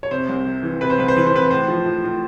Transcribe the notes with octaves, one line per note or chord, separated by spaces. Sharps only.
C#5
C3 C5
C2
C3
E3
C3 B4
C5
C2 B4
C5
E3 B4
C5
C3 B4
A2 C5
F3
A2
A2